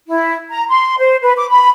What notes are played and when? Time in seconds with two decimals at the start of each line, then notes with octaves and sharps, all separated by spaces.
0.07 E4
0.49 A#5
0.69 C6
0.99 C5
1.22 B4
1.36 D6
1.48 B5